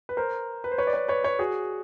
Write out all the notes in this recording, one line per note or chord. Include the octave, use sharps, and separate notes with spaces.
B4
A#4 C5
B4
C5
B4 C#5
D5
B4 C#5
B4 C#5
B4 C#5
F#4 G#4